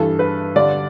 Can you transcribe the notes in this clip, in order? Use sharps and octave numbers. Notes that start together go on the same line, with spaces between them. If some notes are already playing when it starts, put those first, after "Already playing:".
Already playing: G2 E3 A4
B4
G2 D3 D5